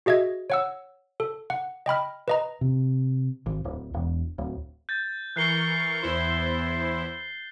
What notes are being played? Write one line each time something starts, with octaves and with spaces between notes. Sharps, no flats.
F#4 G#4 D#5 E5 G#6
C#5 F#5 E6
A4
F#5
D#5 G5 B5 F6
B4 D#5 A#5
C3
G#1
D1
E1
D1
G6 A6
E3 A#4 C#6 F#6 C7 G7
E2 E4 C5